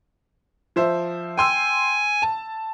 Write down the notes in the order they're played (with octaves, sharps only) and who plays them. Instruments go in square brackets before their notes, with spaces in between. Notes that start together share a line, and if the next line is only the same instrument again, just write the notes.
[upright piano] F3 C5 E5
[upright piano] G5 C6 E6 [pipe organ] G#5
[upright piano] A5